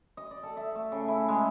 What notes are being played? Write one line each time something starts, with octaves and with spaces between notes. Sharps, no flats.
D#5
D5
A4
E5
A3
C#3
E4
G#3